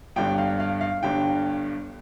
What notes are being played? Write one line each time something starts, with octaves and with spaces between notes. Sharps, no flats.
G1 G2 D3 G5
F5
F5
F5
G1 G2 D3 G5